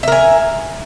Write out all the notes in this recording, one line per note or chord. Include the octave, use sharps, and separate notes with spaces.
A#4 E5 G#5